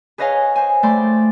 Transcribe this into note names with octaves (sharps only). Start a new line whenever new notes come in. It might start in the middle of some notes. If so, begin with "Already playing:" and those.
G#4 B4 C#5 D#5 F5 G#5
C5 G#5
A3 D5 G5 B5 C6